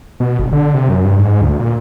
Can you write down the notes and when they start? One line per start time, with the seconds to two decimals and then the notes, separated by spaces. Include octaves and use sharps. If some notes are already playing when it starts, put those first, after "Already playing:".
0.20 B2
0.39 G1
0.52 D3
0.74 C3
0.89 F#2
1.04 G2
1.19 G#2
1.41 D2
1.60 A#2